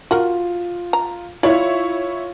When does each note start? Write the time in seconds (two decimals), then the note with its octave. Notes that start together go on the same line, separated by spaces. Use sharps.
0.11 F4 F#4 A#4
0.93 A#5
1.43 E4 F4 C#5 D5